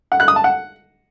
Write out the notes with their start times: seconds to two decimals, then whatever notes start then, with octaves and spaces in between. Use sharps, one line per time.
0.12 F#5
0.20 F#6
0.28 D#6
0.36 A5
0.44 F#5